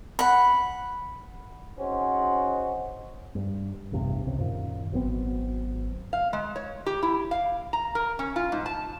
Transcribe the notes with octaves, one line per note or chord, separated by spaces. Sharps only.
F#5 B5
C4 C#4 D#4 F#4 G#4 C5
G2
A1 E2 G2 C3
C#2 C3
F#2 A#2 D#3
G#1 F#3 B3 C4
F5
G#3
C#5
G4
E4
F5
A#5
A#4
C#4
F4
G#2
A5